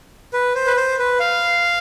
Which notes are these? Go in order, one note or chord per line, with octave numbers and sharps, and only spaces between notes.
B4
C5
B4
C5
B4
F5